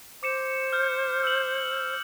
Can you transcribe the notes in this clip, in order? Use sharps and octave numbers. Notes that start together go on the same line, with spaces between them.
C5 D6 C#7 E7
F6 G6
E6 F#7